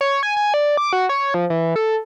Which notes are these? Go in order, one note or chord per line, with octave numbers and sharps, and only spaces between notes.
C#5
G#5
G#5
D5
D6
F#4
C#5
F3
E3
A4